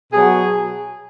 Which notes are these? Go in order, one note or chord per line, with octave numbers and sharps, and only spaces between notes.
B2 F#3 G#4